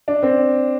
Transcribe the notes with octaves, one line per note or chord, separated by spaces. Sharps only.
D4
C4